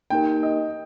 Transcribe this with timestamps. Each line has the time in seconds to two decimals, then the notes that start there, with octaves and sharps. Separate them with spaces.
0.10 A#3 D#4 G4 A#4 G5
0.43 D#5